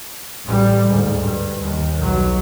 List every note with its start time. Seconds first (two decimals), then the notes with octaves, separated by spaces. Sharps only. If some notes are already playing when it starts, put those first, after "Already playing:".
0.44 A1 G3
0.89 D2 G#2
1.21 G2
1.62 D#2
1.98 B1 F#3